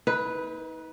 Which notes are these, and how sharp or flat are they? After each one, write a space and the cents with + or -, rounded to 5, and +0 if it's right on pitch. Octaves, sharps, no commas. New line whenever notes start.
D#4 +40 B4 +0